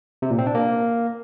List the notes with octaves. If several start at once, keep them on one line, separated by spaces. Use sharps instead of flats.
C3
A#2
C4
D4
A#3